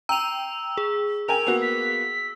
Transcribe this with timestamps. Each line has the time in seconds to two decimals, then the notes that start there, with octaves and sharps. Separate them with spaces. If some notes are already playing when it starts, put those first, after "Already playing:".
0.09 G5 A#5 E6 F7
0.77 G#4
1.28 A#4 G5 G#5 F7
1.47 A#3 B3 F#4
1.62 B6